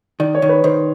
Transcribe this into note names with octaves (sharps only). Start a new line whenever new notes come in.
D#3 D5
C#5
D#3
B4
D#3 C5